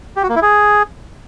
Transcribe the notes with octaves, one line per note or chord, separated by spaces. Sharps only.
G4
F#4
A#3
E4
G#4